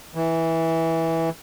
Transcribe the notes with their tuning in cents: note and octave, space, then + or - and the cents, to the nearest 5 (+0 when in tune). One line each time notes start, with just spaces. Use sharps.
E3 -10